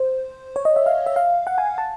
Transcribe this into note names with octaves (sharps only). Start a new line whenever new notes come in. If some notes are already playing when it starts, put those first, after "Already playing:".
Already playing: C5
C#5
D#5
E5
F5
E5
F5
F#5
G#5
A5